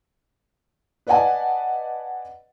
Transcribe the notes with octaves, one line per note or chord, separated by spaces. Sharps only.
B4 D5 D#5 F#5 G#5 A5